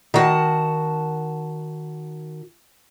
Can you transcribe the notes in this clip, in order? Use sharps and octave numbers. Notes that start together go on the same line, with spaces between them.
D#3 F#4 A5